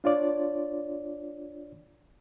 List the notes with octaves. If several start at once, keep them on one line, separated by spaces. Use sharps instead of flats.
D4 F4 C#5 D5